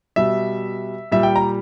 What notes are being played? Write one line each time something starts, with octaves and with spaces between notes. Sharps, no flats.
B2 G3 E5
A#2 G3 E5
G5
A#5